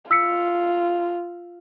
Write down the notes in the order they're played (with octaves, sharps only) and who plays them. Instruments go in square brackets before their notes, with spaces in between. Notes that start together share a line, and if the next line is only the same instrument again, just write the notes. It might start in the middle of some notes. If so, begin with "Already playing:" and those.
[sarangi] F4 [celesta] E6 B6 C#7